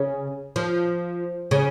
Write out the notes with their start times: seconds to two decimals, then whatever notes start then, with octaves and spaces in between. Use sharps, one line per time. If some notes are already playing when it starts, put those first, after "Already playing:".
Already playing: C#3
0.56 F3
1.51 C#3